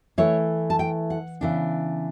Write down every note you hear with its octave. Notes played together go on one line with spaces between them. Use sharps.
E3 A3 E4 C#5
A5
G5
F#5
C#3 E3 B3 D4